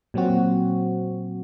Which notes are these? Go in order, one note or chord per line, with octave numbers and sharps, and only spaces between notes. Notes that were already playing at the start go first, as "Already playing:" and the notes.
A#2 F#3 C4 F#4